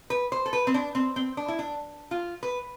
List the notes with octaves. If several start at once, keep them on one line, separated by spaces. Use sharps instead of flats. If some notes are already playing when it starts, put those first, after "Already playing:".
B4
C5
A4
B4
C4
D4
C4
C4
D4
E4
D4
F4
B4